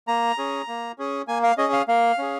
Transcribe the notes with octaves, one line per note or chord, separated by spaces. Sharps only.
A#3 A#5
C#4 G#4
A#3
C#4 G#4
A#3 G#5
F5
C#4 G#4 D#5
F5
A#3 F5
C#4 G#4